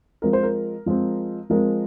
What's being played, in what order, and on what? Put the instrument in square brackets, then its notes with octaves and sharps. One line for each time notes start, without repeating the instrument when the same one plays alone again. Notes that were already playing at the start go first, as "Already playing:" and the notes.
[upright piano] F3 G#3 C4 A#4
C5
A#4
F3 G#3 C4
F3 G#3 C4 A#4